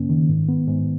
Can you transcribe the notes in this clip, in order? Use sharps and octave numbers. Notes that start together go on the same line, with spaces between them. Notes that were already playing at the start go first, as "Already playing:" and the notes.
Already playing: F#2 C#3 A#3 C#4
D#3
G#2
B3
G#2